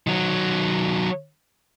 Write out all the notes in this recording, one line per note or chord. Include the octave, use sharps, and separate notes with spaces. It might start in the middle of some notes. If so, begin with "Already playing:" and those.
D#3 F#3